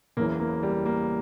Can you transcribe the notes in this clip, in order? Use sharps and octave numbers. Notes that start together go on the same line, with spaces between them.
F#1 E2 C#3 E3 A#3
A#3
G3
A#3